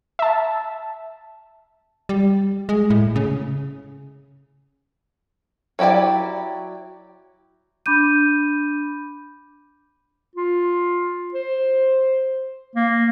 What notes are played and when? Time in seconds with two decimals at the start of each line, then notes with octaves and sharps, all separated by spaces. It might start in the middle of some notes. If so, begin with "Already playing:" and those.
0.19 E5 A5
2.09 G3
2.69 G#3
2.90 A2
3.16 C#3
5.79 F#3 E4 G4 D5 G5
7.86 D4 B5 D6 G6 D#7
10.36 F4
11.34 C5
12.75 A#3